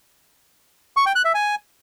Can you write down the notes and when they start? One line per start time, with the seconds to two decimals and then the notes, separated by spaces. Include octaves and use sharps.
0.97 C#6
1.06 G5
1.16 F#6
1.25 E5
1.34 G#5